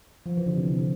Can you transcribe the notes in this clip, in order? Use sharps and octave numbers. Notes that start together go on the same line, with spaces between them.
F3
E3
D3
C3
C3
D3